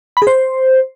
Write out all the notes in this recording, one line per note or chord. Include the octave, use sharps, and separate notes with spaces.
B5
G#4
C5